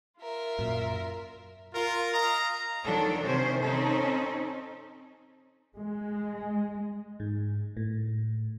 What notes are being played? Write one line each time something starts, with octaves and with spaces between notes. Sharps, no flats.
F4 A#4 E5
F#2 A#2
F4 A#4
D#5 F5 A#5
D#3 F3 F#3 D4 A4
C3 D#3 C#4 C5
C4 C#4 D#4 A4
G#3
G#2
A2